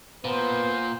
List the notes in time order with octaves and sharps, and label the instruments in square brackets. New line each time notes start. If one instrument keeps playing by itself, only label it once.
[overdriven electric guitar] A#2 [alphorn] B3 [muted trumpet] C5